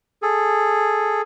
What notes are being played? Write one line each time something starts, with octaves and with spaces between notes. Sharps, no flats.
G#4 A4